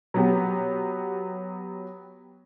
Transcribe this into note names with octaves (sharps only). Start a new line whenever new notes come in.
F#3 B3 G4